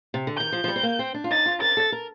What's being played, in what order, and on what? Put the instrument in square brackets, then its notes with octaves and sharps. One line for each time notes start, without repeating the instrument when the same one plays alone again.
[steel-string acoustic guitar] C3
D3
[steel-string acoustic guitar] D#3 [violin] G6
[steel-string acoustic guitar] F3
F3
G3
C4
A#3
C4
D4
F4
[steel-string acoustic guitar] D#4 [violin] A6
[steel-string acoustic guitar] F4
[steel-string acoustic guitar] A#4 [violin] A6
[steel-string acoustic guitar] A4
A#4